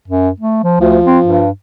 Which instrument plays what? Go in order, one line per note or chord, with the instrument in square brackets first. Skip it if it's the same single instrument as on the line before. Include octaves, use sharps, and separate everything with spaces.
[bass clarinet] F#2
A3
F3
[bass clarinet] D2 [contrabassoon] F3
[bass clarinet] C4
G2